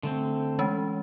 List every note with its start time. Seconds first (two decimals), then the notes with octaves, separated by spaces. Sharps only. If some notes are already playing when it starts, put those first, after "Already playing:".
0.03 D3 A3 C4
0.59 E3 G#3 C#4